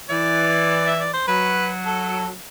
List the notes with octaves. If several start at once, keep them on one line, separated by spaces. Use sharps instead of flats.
E3 D5
E5
D5
C5
F#3 B4
A4